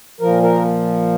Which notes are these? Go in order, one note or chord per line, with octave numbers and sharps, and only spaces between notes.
A#2 F3 A#4
A#4